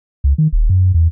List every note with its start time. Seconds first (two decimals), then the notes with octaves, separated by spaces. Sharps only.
0.24 C#2
0.38 D#3
0.52 D#1
0.70 F#2
0.94 E2